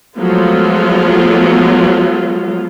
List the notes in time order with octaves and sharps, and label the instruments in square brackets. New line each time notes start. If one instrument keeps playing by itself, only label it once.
[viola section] F3 F#3 G#3 A3 B3 F4